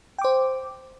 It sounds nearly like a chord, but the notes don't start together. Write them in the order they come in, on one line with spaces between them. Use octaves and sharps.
G5 D6 C5